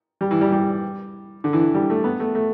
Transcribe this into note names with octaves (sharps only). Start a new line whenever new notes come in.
G3
E3
G3
G3
D3
E3
G3
A3
B3
A3
A3